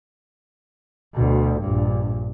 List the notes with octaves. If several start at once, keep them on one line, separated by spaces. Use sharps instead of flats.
D2 B2
A#1 G2